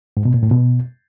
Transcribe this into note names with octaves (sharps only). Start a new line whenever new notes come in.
G#2
B2
A#2
A2
B2